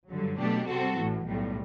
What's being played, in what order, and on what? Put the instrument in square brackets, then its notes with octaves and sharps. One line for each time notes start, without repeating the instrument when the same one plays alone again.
[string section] G2 D3 F#3
B2 F#3 A3 D4 G4
C3 G3 C4 F#4 A4
A1 A2 E3
B1 A2 G3